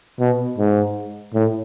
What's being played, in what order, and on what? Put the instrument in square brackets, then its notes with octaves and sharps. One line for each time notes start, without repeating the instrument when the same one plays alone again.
[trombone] B2
G#2
A2